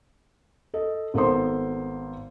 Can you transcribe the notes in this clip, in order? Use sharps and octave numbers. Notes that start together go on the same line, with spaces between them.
A4 D#5
G#1 B3 A4 A#4 C5 C6